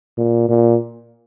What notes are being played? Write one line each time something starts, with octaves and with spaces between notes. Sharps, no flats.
A#2
A#2